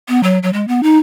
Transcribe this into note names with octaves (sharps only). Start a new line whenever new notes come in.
B3
F#3
F#3
G#3
B3
D#4